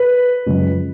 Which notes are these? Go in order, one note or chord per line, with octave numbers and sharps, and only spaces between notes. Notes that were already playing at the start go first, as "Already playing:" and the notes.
Already playing: B4
F#2 C#3 F3 G#3